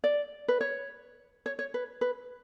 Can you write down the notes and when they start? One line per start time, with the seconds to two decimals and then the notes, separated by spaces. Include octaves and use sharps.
0.04 D5
0.48 B4
0.61 C#5
1.46 C#5
1.59 C#5
1.74 B4
2.01 B4